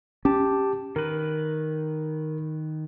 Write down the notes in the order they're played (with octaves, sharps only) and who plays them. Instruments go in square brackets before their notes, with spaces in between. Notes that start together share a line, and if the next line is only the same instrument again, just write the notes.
[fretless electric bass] C#4 [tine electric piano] G4 A5
[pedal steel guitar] D#3 B4 [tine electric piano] A#4